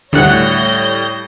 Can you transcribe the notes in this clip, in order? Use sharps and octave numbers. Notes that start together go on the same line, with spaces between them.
D2 A2 G3 C#5 F#5 G6 A#6